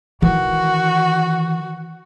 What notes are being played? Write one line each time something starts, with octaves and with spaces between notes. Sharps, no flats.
D#3 E3 F#4